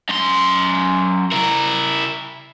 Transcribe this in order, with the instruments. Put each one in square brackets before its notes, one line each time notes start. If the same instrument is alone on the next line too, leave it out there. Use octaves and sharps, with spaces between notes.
[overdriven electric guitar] F#2 C6
E4 A#4